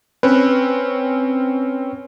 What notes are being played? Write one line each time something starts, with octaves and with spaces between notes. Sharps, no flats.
C4 C#4 B4